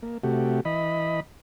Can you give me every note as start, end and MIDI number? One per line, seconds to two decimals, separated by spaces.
0.03 0.18 58
0.24 0.60 48
0.24 0.60 57
0.24 0.60 66
0.24 0.60 67
0.65 1.20 52
0.65 1.20 75
0.65 1.20 83